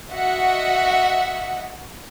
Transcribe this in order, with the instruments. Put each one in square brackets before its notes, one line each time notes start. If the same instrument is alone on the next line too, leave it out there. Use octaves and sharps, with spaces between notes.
[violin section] F#4 D#5 E5 F#5